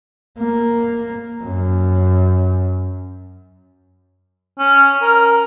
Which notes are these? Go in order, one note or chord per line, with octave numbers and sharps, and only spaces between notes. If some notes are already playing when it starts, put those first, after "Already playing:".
A#3
F#2
C#4
A#4